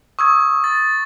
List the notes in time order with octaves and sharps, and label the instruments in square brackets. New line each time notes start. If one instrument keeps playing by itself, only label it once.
[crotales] C#6 [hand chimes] D#6 E6 G#6
[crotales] A6